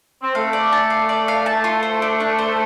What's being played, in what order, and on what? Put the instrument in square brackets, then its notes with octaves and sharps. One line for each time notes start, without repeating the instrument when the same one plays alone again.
[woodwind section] C4
[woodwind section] A3 [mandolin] F5
[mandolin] D5
A5
F5
D5
F5
A5
F4
C5
D4
D4
C5